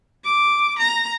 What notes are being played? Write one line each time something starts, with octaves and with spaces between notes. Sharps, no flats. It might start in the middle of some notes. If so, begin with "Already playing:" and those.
D6
A#5